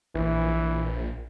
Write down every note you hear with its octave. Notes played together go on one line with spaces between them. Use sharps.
A#1 E3